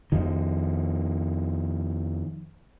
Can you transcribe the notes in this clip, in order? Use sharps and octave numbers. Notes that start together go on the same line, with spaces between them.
F2 D#3